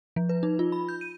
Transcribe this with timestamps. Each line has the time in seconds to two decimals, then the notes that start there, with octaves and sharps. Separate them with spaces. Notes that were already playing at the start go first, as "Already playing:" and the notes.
0.16 F3
0.29 B4
0.43 D#4
0.59 F4
0.72 B5
0.89 G6
1.01 D#7